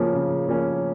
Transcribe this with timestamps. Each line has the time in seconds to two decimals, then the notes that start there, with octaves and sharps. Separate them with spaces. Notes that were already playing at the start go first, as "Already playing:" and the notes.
Already playing: C#3 F3 A#3 C#4
0.14 C#3
0.48 F3 A#3 C#4